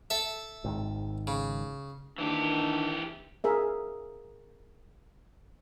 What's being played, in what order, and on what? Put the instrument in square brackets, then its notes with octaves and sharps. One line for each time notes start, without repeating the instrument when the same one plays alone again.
[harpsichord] A4 E5
[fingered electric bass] G#1 G#2 D#3
[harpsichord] C#3
[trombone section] D#3 [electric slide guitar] E3 G4 [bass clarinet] D4
[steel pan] G#4 A#4 E5